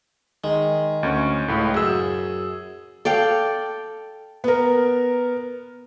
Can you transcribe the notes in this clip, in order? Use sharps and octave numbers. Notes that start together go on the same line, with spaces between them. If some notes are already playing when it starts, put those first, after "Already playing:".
D#3 G#3
D2 C#4 C#6
C#2 A2
F#2 G#4 E6
A4 D5 F5 G5
B3 A#4